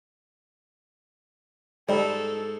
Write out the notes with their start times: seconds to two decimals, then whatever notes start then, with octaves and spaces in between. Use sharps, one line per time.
1.89 G#2 G3 A4